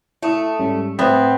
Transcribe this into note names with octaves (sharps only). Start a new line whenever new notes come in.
A3 E4 D#6
G#2 G3 C#4
A2 B3 C4 E5